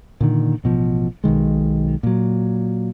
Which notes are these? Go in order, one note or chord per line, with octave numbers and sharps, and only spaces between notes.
A#2 D3 D#3
A1 B2 F3
B1 B2 D#3 G#3
A#2 F#3